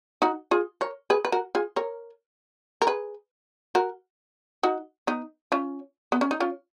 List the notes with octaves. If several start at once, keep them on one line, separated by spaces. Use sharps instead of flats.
D#4 F#4
F4 G#4
A#4 C#5
G#4 B4
B4
F#4 A#4
F4 G#4
A#4 C#5
A#4
G#4 B4
F#4 A#4
D#4 F#4
B3 D#4
C#4 F4
B3
C#4
D#4
C#4 F4